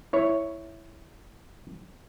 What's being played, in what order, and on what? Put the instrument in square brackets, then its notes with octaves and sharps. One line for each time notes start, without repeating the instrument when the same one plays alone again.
[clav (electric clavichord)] E4 C#5